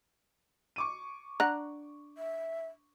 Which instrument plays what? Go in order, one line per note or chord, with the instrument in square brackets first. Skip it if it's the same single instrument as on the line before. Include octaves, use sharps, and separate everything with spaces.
[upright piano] C#6 D6 D#7
[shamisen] D4 F#5 [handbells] A#5 F#6 A#6
[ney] E5